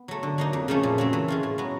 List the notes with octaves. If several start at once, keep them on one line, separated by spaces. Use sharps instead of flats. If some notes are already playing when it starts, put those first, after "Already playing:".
Already playing: B3
F#3 A3
D3
F#3 A#3 D#4
F2
C#3 F3 A3 C#4
A#2
F#3 A3 C4
E3
G#3 C#4 F4
A2
F#3 B3